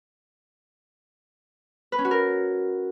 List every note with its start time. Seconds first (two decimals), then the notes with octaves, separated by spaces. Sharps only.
1.92 B4
1.98 C#4
2.05 F#4
2.11 A#4